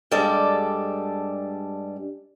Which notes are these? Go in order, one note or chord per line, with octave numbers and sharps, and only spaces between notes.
G2 G3 G#3 D4 A4 D5